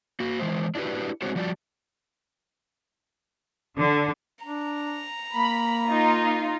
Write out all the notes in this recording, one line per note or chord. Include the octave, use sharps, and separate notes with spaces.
A#3 F#4
E3 G#3 C5
D4 E4 F#4 G4 B4
G#3 C4 D4 F#4 C5 C#5
F3 G3 F#4 D5 E5 A5
D3
D4 A#5
A#3 B5
D#4 F4